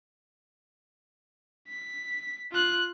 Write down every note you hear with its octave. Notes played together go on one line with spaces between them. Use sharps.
B6
F4 F#6